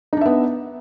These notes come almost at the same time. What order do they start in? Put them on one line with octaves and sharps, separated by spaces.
D#4 D4 E5 B3